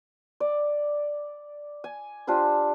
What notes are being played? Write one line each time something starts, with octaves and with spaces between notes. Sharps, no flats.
D5
G#5
D4 F4 G4 C5